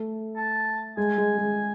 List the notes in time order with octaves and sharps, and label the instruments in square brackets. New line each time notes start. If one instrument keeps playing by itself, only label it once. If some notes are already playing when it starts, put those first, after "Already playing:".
Already playing: [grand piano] A3 A4
[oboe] A5
[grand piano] G#3 G#4 [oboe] G#5
[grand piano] G#3 G#4
G#3 G#4